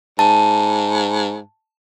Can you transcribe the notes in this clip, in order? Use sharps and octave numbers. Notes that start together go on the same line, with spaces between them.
G#2 A5